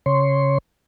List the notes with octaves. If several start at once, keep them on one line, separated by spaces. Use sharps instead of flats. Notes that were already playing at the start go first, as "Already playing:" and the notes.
C#3 C#5 C6